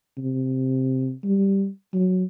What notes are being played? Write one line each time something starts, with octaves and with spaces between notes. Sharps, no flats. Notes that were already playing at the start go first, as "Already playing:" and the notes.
C3
G3
F#3